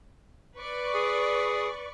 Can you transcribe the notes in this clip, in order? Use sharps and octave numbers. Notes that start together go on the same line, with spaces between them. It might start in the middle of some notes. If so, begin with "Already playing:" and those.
B4 D5 C#6
G#4